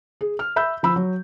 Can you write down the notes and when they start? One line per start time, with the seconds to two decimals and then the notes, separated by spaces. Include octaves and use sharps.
0.21 G#4
0.39 F6
0.56 E5 B5 E6 G6
0.83 F3 B5 E6
0.96 F#3